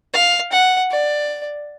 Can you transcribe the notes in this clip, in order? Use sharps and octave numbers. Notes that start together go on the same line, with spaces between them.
F5
F#5
D5